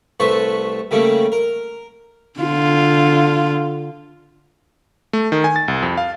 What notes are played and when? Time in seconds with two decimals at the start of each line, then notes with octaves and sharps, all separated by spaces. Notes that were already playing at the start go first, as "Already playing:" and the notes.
0.20 C2 A3 B4 C5 A5 C#6
0.91 C#3 G3 A3 A#3 C#4
1.32 A#4
2.40 D3 F4
5.13 A3
5.32 D#3
5.44 G#5
5.56 A6
5.68 C2
5.82 F2
5.97 F5